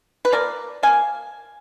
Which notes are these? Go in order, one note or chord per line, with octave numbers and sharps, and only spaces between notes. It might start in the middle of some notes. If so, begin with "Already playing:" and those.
B4
F3 A#3 A#4 D5
F3 A#3 F5 G#5